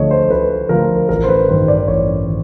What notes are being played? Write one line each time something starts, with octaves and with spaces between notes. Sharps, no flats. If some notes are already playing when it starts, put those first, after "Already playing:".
Already playing: D2 D3 F3 A3 C#5 D#5
C5
D2 B4
D3 F3 A3 A#4
A1 A#4
C5
B4
G2 D#3 C5
D5
A1 C#5
D#3